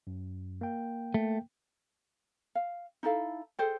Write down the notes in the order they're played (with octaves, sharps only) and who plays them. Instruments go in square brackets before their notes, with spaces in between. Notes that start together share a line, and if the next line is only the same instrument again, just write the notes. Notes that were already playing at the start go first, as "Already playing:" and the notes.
[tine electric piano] F#2
A#3 G5
[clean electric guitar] A3
[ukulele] F5
D#4 E4 A4 F5
G#4 A4 C5 G5